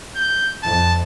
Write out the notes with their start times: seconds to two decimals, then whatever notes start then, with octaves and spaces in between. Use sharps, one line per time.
0.16 G6
0.63 F2 A5